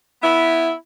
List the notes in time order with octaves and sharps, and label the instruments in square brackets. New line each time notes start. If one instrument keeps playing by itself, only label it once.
[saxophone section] B3 E4